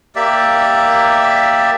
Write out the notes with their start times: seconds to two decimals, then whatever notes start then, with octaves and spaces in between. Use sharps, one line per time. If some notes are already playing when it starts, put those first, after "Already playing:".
0.16 A#3 G4 D5 E5